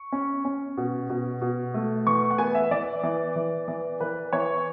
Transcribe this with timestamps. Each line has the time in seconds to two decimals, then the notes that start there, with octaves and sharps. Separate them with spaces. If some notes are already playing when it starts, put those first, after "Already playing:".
Already playing: C#6
0.12 C#4
0.45 C#4
0.77 B2
1.10 B2
1.42 B2
1.74 A3
2.07 E3 C#6
2.30 F#5
2.38 B3 G#5
2.55 E5
2.71 E3 D5
3.03 E3
3.36 E3
3.68 E3
4.00 E3 B4
4.33 E3 C#5